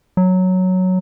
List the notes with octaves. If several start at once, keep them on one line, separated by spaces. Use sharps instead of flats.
F#3